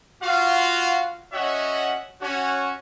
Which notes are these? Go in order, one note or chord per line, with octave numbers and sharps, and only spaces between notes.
F4 F#4 F5
C#4 F#4 C#5 D#5 E5 F#5
C#4 F#4 C#5